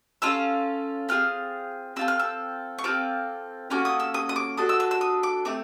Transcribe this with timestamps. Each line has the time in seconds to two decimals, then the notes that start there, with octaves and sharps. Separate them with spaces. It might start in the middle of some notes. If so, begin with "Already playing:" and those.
0.22 C#4 F4 A4 E6
1.09 C4 F4 G#4 F6
1.96 C4 F4 A4 E6
2.08 F6
2.19 E6
2.78 C#6
2.84 C4 F4 A4 D6
3.70 A#3 C#4 F#4 A4 D6
3.85 D#6
4.00 E6
4.14 D#6
4.29 D#6
4.36 D6
4.57 D4 F#4 A4 D#6
4.69 E6
4.80 E6
4.91 E6
5.01 D#6
5.23 D6
5.45 A3 C4 D6